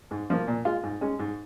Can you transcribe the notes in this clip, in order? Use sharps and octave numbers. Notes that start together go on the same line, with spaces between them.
G#2
F3 A#3
A#2
G#3 F4
G#2
G#3 C#4
G#2